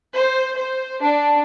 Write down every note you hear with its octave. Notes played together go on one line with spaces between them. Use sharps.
C5
C5
D4